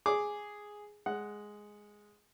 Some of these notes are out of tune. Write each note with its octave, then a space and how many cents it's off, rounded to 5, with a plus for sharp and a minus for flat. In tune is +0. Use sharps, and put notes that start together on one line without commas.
G#4 +0 D6 +0
G#3 +0 F#5 +5